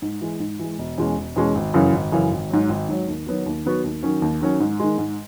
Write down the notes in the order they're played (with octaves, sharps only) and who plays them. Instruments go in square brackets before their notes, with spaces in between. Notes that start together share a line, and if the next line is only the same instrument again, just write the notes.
[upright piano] G#2
E3 G#3
G#2
E3 G#3
E1
E2 B2 G#3 C#4
E1
E2 B2 G#3 C#4
G#1
F#2 C#3 E3
G#1
F#2 C#3 E3
G#1
G#2 F#3
G#1
G#2 F#3
D#2
D#3 F#3 B3 F#4
D#2
D#3 F#3 B3 F#4
D#2
D#3 F#3 C#4
D#2
D#3 F#3 C#4
G#2
D#3 G#3
G#2